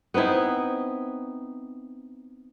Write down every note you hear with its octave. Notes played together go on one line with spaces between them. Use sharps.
B3 C4 D#4 E4